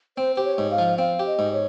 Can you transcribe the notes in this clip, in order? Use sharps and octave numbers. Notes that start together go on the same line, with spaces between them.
C4 C5
G4 C5
C#5
G#2
F5
F3
C4 F5
G4
D#5
G#2
C#5